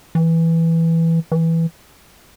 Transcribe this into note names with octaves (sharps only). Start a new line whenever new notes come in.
E3
E3